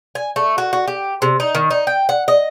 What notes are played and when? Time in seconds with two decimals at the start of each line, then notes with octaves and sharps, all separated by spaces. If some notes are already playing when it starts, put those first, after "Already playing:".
0.15 G#5
0.36 A3
0.58 F#4
0.73 F#4
0.88 G4
1.22 C3
1.40 D#4
1.55 D#3
1.71 D#4
1.87 G5
2.09 F#5
2.28 D#5